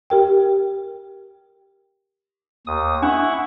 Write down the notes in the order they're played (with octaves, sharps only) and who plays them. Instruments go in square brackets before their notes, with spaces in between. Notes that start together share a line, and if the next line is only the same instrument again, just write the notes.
[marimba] G4 A#4 G5
[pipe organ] D#2 D#6
[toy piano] D4 [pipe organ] E4 F#5 C#6